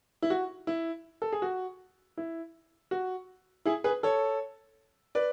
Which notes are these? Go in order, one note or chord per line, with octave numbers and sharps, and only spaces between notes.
E4
F#4
E4
A4
G#4
F#4
E4
F#4
E4 G#4
G#4 B4
A4 C#5
B4 D5